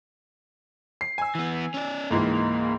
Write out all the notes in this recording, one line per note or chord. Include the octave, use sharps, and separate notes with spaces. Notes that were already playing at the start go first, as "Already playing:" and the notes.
C7
G#5 E6
E3 B3
C#4 D5
C#2 G#2 E3 A#3